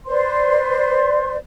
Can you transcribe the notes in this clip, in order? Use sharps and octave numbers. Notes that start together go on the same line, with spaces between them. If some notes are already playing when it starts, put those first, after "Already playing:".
B4 C5 D5 C6